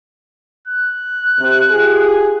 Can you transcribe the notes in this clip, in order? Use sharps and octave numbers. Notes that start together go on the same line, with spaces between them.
F#6
C3
F4 G4 G#4